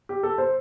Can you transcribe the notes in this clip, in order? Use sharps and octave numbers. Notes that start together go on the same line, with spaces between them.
G4
A4
C5